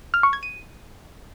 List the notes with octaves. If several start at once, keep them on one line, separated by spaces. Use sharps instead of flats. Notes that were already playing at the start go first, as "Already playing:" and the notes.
F6
C#6
G#6
D#7